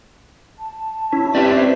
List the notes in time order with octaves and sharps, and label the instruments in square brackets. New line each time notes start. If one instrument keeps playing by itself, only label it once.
[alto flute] A5
[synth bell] C#4 [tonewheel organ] E4
[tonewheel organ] C4 E5 [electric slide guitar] D4 B4 D5 [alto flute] G4
[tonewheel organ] C5